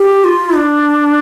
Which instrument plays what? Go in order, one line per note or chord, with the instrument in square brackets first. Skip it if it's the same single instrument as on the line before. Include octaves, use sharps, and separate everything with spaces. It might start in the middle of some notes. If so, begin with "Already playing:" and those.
Already playing: [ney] G4
F4
D4